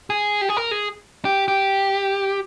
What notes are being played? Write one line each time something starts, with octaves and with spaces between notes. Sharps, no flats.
G#4
G4
G#4
A#4
G#4
G4
G4